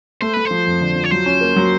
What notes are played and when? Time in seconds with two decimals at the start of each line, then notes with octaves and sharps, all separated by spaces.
0.21 A3 C5
0.33 A3 B4
0.45 C5
0.51 F3
0.66 F2
0.81 D3
0.96 F3
1.04 C#5
1.11 F#3 C5
1.26 C#4
1.41 A#3
1.56 F#3